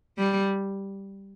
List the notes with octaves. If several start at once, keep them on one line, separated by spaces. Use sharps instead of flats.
G3